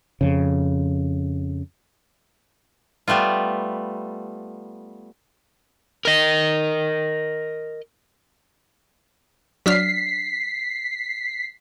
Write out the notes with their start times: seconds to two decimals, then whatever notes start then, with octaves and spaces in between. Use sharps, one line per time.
0.21 F2 C#3
3.08 G3 A3 B3 F4
6.05 A#4 D#5
9.66 F#3 D4 F6 B6 C7